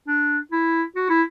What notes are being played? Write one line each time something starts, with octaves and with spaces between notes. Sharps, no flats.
D4
E4
F#4
E4